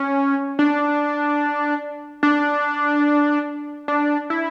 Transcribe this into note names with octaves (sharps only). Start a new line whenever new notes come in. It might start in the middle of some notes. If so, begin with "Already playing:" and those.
Already playing: C#4
D4
D4
D4
E4